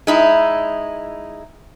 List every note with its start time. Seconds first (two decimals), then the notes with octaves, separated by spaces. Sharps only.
0.07 G#3 D#4 E4